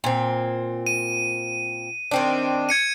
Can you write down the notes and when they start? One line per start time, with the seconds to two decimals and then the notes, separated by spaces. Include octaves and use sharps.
0.04 A#2 C4
0.87 D#7
2.11 D#3 C4 D4
2.69 G#6 C#7 D#7